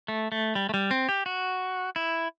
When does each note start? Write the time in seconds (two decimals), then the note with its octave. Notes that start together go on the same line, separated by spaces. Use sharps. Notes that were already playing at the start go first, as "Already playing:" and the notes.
0.08 A3
0.32 A3
0.55 G3
0.69 A3
0.74 G3
0.91 C4
1.09 G4
1.26 F#4
1.96 E4